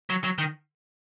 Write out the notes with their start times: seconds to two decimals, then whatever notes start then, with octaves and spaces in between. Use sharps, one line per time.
0.10 F#3
0.24 F#3
0.38 D#3